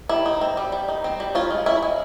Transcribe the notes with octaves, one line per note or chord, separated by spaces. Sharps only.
G3 E4
D#4
C4
G3
G3
D#4
C4
G3
C#4 F4
G#3
C#4 E4
G#3